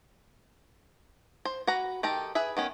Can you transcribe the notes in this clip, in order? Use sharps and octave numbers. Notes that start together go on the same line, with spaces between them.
C5
F#4 B4 A#5
D#3 G4 A4 A#5
G#4 B4 E5
D#3 B3 C#4